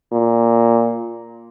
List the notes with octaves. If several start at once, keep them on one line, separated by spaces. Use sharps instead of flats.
A#2